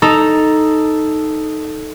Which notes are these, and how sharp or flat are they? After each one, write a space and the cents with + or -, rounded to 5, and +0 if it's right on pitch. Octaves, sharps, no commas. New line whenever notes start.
D#4 +0 A4 +0 A#5 +0